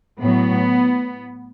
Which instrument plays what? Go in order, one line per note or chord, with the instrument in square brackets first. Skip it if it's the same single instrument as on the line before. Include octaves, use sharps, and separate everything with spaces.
[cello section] A2 F#3 B3